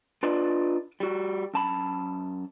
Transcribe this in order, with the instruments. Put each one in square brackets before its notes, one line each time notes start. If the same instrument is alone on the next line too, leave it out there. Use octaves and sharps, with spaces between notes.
[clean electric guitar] D4 F4 B4 D5 D#5
G3 F#4
F#2 A5 B5